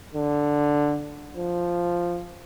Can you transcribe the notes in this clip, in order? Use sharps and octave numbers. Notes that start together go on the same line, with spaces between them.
D3
F3